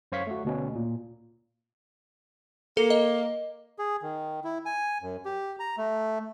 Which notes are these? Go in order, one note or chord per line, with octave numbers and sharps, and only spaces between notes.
F#2 C5 C#5 F5 C#6 B6
A3 F#4
D2 B2 C#4
A#2
A#3 A4
D#5
G#4
D#3
E4
G#5
F#2
G4
A#5
A3